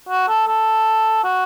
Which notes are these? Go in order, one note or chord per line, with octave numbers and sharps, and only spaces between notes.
F#4
A4
A4
F#4